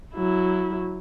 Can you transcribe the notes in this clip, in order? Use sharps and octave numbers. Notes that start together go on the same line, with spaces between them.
F#3 E4